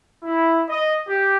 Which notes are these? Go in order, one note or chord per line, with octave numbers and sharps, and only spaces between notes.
E4
D#5
G4